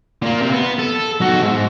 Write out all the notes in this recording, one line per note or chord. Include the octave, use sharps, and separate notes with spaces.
A#2 A#3
C3
B3
A4
B1 F#4
G#2